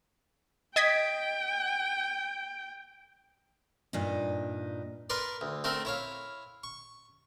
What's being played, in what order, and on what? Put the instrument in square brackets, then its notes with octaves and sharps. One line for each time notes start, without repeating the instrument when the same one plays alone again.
[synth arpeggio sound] D#5 G#6 B6 [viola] G5
[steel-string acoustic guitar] G2 A#2 D4 D#4
[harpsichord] A#4 B4 D5 C6
D2
A3 C4 A4 A#4
E4 C#5 F5
C#6